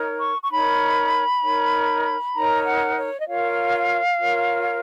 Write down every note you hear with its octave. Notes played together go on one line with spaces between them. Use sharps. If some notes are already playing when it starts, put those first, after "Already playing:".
Already playing: D#4 A#4 C#5
C#6
C#6
D#4 A#4 C#5 B5
D#4 A#4 C#5
D#4 A#4 C#5 A#5
F#5
C#5
D#5
F4 A#4 C#5 F5
F4 A#4 C#5